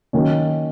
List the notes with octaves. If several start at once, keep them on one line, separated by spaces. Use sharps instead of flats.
D#3 F#3 A#3 C#4